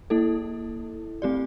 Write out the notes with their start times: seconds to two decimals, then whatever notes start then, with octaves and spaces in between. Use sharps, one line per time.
0.10 A#3 E4 A4
1.22 A3 C4 G4 D5